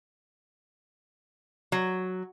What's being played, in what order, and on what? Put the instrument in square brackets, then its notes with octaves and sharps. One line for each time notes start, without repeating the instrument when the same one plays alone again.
[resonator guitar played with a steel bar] F#3